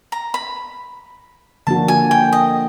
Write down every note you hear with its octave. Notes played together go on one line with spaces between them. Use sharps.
A#5
B5
D3 F3 A#3 D4 F#4 A5
G#5
G5
D#5